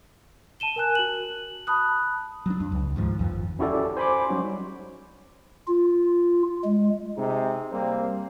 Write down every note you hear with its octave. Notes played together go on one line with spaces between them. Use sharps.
A5 D#7 E7 G7
A#4 G#5 F#6
F#4 F#7
A5 B5 D#6 F#6
F#3 D4
F2
C#2
D#2 G#2 F3
G1 F2 E3 F3
C#4 E4 F#4 G4 A4 D5
C5 G#5 B5 C6 D6
F#3 G3 C#4 D#4 F#4
F4
G#3
C3 D#4 G#4
G3 A#3 C4